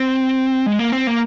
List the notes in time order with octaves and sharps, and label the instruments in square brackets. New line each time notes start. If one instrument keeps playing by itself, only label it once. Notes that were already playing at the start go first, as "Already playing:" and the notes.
Already playing: [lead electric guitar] C4
G#3
A#3
C4
A#3